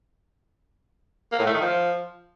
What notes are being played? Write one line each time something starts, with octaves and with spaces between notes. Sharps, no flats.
A#3
A2
A3
D#3
F3